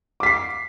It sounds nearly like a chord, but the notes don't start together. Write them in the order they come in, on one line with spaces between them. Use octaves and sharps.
D6 B6 C7